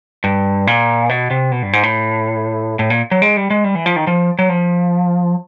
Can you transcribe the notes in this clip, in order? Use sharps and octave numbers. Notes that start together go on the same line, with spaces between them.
G2
A#2
B2
C3
B2
G2
G#2
A2
A2
A#2
F#3
G#3
G3
G#3
G3
E3
F3
D#3
F3
F#3
F3